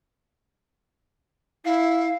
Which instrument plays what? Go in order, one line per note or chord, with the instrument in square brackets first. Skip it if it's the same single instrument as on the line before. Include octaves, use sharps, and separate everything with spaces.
[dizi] E4 [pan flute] F5